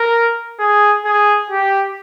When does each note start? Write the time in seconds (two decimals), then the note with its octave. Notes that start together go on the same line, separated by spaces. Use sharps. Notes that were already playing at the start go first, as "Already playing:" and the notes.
Already playing: A#4
0.59 G#4
1.05 G#4
1.51 G4